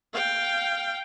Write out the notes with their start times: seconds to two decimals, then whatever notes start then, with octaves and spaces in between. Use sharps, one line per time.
0.14 F5 G5